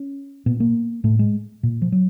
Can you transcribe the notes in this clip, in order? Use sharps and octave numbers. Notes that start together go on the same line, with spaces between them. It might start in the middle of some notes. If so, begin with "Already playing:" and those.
Already playing: C#4
A#2 B3
A#3
A2 A3
G#3
A#2
F3
F#3